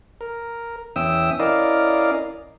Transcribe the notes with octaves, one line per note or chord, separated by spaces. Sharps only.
A#4
E2 C#4 E5 G5 D#6 E6
C#4 E4 A#4 D5 D#5 F5